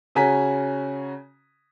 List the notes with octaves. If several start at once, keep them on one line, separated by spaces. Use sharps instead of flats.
C#3 C#4 F#4 G#5 A#5 B6